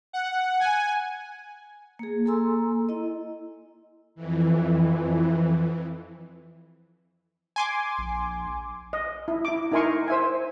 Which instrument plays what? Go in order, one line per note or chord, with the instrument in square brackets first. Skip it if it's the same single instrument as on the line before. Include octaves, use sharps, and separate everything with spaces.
[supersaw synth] F#5
G#5
[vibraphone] A#3 G#4
A#3 A4 G#5 A#5 C6 E6
E4 D#5
[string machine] F2 E3
[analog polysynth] G#5 C6 D6
[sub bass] A#1
[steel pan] D#5
E4
E4 D6
D#4 E4 A#4 G#5 C6 C#6
C5 E5 G#5